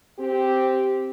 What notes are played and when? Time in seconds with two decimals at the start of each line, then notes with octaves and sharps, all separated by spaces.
0.19 C4 G4